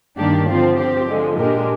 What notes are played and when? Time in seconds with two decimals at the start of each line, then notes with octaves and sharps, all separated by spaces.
0.18 G2 D#3 A#3 D4 G4
0.48 D3 F3 C4 F4
0.78 F3 C4 G4
1.08 D3 F3 G#3
1.38 A#2 G#3 D4 G4 A#4